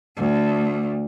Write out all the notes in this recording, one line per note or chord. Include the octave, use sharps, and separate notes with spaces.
D2